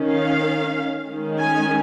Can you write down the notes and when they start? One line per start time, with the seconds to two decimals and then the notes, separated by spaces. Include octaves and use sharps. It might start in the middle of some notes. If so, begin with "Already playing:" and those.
Already playing: D#3 C#4
0.11 F5
1.07 D#3 G#3 C#4
1.39 G#5